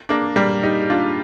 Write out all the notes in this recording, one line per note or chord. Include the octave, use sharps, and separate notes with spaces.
A#3 D4
G3 A#3
D#4 G4
D4 F4